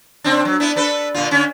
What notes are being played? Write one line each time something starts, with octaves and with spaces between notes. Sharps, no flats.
C#3 C4 D4
F#3
B3 D4 E4
D4 A4 B4
A#2 D3 F4
D3 C#4